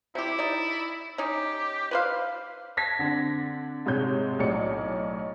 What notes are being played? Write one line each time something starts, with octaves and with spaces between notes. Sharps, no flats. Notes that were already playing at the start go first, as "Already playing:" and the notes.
C3 E4 G4
D#4 D5
C#4 D#4 G4
B4 C5 F5
A5 G#6 A#6 B6
D3 C4 D4
G#2 C3 G#3 C#5 G6
B1 A2 C#5 D5 C#7